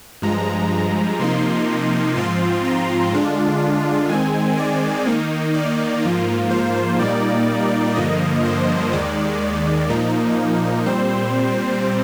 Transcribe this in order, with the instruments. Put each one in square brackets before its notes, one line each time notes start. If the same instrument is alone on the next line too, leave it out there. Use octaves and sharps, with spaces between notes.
[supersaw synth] G2 F3 G#3 A#5
C3 F3 A#3 D#4 C6
G#2 F3 C4 F4 C6
A#5
D3 G#3 D4 F4
D#3 G#3 C4 G#5
D5
D#3 A#3 D#4
D5
G#2 F3 A#3 F4
C5
A#2 G3 A#3 D#4 D5
G2 D3 F3 A#3 D#5
C5
D#2 D#3 G#3 D5
A#2 F3 A#3 D#4
A#2 G3 C4 C5